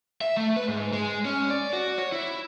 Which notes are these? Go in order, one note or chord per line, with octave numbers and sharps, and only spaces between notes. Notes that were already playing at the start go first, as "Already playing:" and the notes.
E5
A3
B4
G#2
G#3
C#4
D5
F#4
C#5
E4